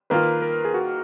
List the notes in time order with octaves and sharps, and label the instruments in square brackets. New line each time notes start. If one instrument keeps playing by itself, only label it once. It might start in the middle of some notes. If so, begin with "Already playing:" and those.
[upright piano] D#3 A#3 F4 [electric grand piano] B4
[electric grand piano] A#4
G#4
F#4